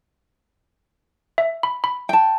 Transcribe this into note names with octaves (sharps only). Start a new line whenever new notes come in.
E5
B5
B5
G5 A5